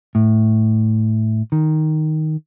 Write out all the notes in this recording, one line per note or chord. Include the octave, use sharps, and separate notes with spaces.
A2
D#3